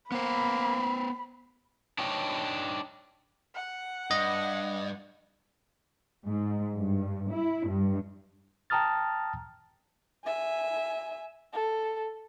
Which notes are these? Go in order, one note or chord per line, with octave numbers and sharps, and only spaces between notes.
A#3 B3 C5 B5
D4 D#4 C#5 G5
F#5
G2 D#5
G#2
G2
E4
G2
G5 A5 A#5 D#6 F6 A6
E5 G#5
A4